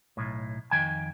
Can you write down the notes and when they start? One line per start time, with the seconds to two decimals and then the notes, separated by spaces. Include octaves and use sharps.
0.17 B1 A2
0.71 F2 D#3 G5 G#5